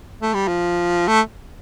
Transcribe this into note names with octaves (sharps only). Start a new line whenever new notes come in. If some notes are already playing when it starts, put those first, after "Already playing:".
A3
G3
F3
A3